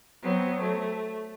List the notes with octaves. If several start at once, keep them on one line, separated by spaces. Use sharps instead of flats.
F#3 B3 C4
A3